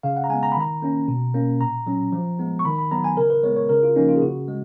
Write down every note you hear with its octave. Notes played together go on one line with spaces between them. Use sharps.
C#3 F5
F#5
A#5
G#3 B3 G#5
A#5
B5
D#3 A#5
A#3 C#4
B2
A#3 C#4
A#2 A#5
F#3 C#4
F3
G#3 B3
C#6
D#3 B5
B5
F#3 B3 A#5
G#5
C#3 A#4
B4
G#3 B3 C#5
C#5
C#3 A#4
F4
F3 A#3 C#4 D#4
F4
G#4
C#3 F#4
G#3